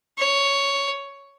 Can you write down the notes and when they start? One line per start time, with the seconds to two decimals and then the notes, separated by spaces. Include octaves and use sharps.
0.18 C#5